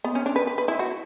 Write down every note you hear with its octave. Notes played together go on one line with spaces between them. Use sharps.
B3
C#4
D4
B4
B4
B4
E4
F#4